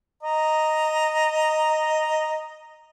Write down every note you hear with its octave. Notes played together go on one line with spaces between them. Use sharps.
D#5 A#5